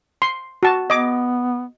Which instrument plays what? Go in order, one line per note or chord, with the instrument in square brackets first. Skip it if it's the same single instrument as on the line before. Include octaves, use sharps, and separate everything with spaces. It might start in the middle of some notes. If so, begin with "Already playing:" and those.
[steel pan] C6
F#4 A5
[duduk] B3 [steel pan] D#5 D6